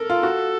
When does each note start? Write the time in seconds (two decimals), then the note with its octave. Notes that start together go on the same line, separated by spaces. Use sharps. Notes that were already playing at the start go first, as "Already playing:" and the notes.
Already playing: A4 A#4
0.10 F4
0.23 F#4